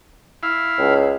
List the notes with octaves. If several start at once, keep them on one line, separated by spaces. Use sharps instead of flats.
E4 F5
C#2